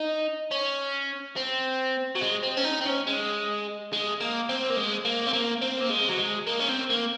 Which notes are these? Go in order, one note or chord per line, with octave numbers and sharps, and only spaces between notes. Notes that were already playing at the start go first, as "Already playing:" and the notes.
Already playing: D#4
C#4
C4
F#3
G#3
C4
C#4
D#4
C4
C#4
G#3
G#3
A#3
C4
A#3
G#3
A#3
C4
A#3
C4
A#3
G#3
F#3
G#3
A#3
C#4
C4
A#3